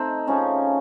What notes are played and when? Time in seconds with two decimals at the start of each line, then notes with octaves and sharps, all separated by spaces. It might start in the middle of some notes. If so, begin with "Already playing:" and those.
Already playing: A3 C4 D#4
0.27 C#3 F3 A3 C#4